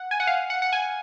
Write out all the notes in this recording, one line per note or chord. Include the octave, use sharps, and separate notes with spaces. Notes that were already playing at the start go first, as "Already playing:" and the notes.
Already playing: F#5
G#5
F#5
F5
F#5
F#5
G#5